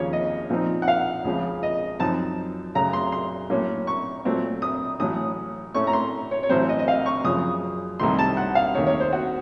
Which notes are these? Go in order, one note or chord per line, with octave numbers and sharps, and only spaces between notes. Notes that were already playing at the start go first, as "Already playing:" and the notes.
Already playing: D#2 C#3 F3 A#3 C#4 C#5
D#5
A#2 F3 C4 D#4
F#5
F5
C#2 C#3 F3
D#5
F#2 F3 C4 D#4 A5
F#2 C#3 A3 A#5
C6
C6
A2 F#3 A#3 C#4
C#6
A#2 F#3 A3 C4
D#6
A1 A2 F#3 D#6
A2 A3 C#4 C#6
A#5
C6
C#5
C#5
A1 A2 F#3 C4 C5
D#5
D#5
F5
C#6
F#2 C#3 F3 D#6
C2 C3 D#3 A3 D#4 C6
A5
F#5
F5
D#2 D#3 A3 D#4 C#5
C#5
C5
F#4